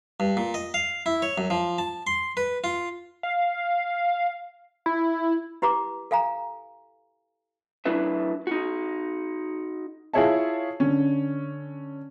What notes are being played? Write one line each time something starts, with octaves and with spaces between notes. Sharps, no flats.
G2
A#2
D#5
F5
E4
C#5
F#2
F3
A5
C6
B4
F4
F5
E4
E4 G4 B4 A#5 D6
A4 F5 G#5 A#5
F#3 D4 E4 B4 E5
D#4 F#4
E4 F4 G#4 C#5 E5 A5
D3 C#4